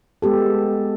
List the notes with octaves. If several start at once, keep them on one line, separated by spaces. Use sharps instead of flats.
G#3 B3 G4 A4